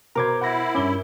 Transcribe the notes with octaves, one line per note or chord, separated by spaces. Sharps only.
B2 A#4 C5 A#5 B5 D6 G#6
E4 F#5 A#6
G2 C#4 D6 G7